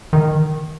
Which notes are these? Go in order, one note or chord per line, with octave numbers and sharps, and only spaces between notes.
D#3